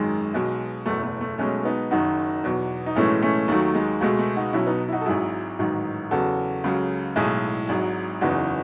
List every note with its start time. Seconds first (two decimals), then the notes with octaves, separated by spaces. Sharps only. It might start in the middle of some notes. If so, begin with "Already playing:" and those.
Already playing: G#1 F#2 D#3 G#3
0.34 B1 B2 G#3
0.86 F#1 E2 B2 F#3 A3
1.04 A3
1.21 A3
1.38 B1 B2 G#3 A3 C#4
1.65 B3 D#4
1.91 F#1 F#2 D#3 F#3 D#4 F#4
2.44 E2 B2 F#3
2.86 D#4
2.96 B1 A2 E3 G#3 A3 C#4
3.22 A3 C#4
3.48 D#2 D#3 F#3 A3
3.75 G#3
4.01 C#2 B2 G#3 A3
4.19 A3
4.36 D#4 F#4
4.53 B1 B2 F#3 C#4 E4
4.66 B3 D#4
4.88 E4
4.92 D#4 F#4
5.01 A4
5.06 G#1 G#2 F#3 E4 G#4
5.59 A1 G#2 D#3 F#3
6.11 E2 C#3 F#3 F#4 A4
6.64 C#2 C#3 F#3
7.16 B1 A2 G#3 E4 G#4
7.69 G#1 G#2 F#3
8.21 F#1 E2 C#3 E3 D#4 F#4